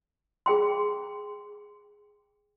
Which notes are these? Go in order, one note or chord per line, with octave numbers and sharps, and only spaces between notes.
G#4 G5 C6